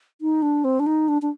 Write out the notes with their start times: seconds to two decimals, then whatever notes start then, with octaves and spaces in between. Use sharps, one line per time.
0.21 D#4
0.42 D4
0.64 C4
0.80 D4
0.86 D#4
1.08 D4
1.22 D4